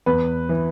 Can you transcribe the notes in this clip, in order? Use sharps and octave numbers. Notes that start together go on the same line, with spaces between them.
E2 B4
E3